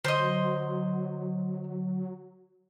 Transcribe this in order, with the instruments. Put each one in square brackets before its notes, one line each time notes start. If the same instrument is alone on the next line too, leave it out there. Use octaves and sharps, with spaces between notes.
[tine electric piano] D3 [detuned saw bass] F#3 [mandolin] C5 D#5